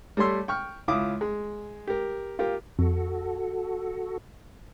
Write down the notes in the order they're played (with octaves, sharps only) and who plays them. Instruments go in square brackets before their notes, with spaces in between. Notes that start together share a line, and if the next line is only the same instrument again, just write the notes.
[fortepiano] G3 A3 C#5 C6 E6
G5 C#6 F6
C#2 E4 F4 D6 D#6
G#3
G4 A#4
F4 G4 A#4
[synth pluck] F2 [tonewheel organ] F#4 A4